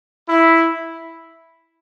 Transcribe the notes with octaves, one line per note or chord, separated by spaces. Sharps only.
E4